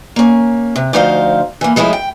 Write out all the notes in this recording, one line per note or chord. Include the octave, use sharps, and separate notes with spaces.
A#3 C#4
C3
D2 F3 D#4 C5 D#5 F5
E3 A#3
F3 G#3 A3 C#4 E4
G5